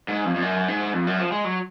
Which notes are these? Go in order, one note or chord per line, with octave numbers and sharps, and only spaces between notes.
G#2
F2
F2
F#2
G#2
F2
F#2
F3
G#3
F#3